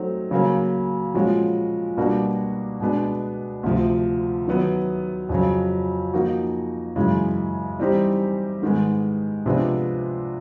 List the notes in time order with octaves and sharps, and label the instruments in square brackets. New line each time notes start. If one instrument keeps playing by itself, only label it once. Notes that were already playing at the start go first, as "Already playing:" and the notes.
Already playing: [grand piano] F#3 A3 C4 D#4
C#3 F#3 A#3
A#2 F3 G#3 C#4 F#4
B2 G3 A#3 D4 F#4
B2 G#3 B3 D4
D2 C3 F3
D#3 F#3 B3
F2 C#3 F#3
F3 A#3 D#4 F#4
F#2 C#3 E3 G#3
E3 G3 C4 D#4 G4
G#2 D#3 G#3 B3
C3 F3 G#3 B3 D4